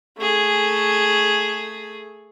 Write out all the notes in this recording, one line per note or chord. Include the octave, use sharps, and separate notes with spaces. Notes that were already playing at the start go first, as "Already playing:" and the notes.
A3 G#4